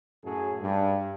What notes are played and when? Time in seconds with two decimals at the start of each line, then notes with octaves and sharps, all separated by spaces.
0.24 F#2 A2 F#3 G#4 A4
0.61 G2